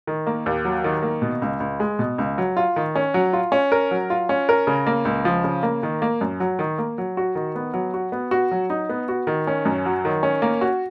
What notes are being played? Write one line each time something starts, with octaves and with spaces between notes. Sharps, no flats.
D#3
A#3
D#2
F#3
D#3
A#3
B2
C#2
C#2
G#3
B2
C#2
F#3
F4
D#3
C#4
F#3
F4
C#4
A#4
F#3
F4
C#4
A#4
C#3
A#3
C#2
F3
C#3
A#3
D#3
A#3
F#2
F#3
D#3
A#3
F#3
F#4
D#3
B3
F#3
F#4
B3
F#4
F#3
D#4
B3
F#4
D#3
C#4
F#2
F#3
D#3
C#4
A#3
F#4